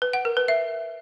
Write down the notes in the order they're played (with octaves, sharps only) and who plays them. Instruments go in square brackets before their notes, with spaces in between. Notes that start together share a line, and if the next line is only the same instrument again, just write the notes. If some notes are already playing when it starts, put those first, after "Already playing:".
[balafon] B4
F#5
A#4
B4
E5